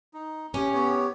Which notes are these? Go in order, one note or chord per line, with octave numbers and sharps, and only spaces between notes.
D#4
A2 C#4 G4
B3 G4 C#5